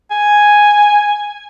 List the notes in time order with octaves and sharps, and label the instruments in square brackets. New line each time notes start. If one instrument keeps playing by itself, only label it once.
[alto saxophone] G#5